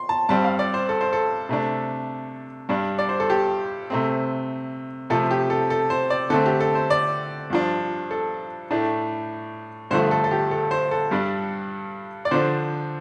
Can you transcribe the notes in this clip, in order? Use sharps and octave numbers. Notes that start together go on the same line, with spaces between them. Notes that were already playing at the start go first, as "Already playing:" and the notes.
Already playing: C6
A5
G2 G3 C4 A5
F5
D5
C5
A4
C5
A4
C3 A3 D4
G2 G3 D4
D5
C5
A4
G4
C3 A3 C4
C3 F3 A3 A4
G4
A4
A4
C5
D5
D3 A3 C4 A4
G4
A4
C5
D5
G2 F3 D4
A4
A2 A3 D4
G2 D3 F3 A3 C5
A4
A4
G4
A4
C5
A4
G2 G3 D4
D5
D3 F3 D4 C5